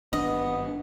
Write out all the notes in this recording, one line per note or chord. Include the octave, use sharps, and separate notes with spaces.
G#1 G2 B3 D4 D#5